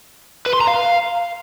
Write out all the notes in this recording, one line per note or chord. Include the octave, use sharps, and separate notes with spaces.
B4
C6
A#5
F5